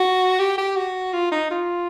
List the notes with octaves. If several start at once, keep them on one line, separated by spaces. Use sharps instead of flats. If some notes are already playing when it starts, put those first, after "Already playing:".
Already playing: F#4
G4
G4
F#4
F4
D#4
F4